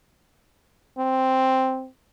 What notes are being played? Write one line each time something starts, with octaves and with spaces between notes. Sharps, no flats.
C4